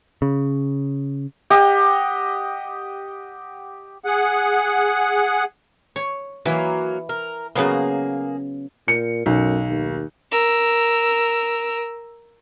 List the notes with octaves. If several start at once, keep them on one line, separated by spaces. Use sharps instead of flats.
C#3
G4 D#5 F#5
G#4 F#5
C#5
E3 F#3 A#3
A#4
C#3 F#3 A#3 B3 G#4
A#2 C#7
B1 F#2
D#2
A#4 E6